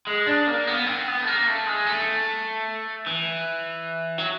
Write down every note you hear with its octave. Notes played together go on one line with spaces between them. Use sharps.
G#3
D4
A#3
B3
C4
B3
A3
A#3
A3
G#3
A3
E3
F#3